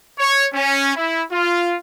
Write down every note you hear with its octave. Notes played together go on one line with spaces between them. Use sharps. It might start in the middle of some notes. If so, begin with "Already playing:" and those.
C#5
C#4
E4
F4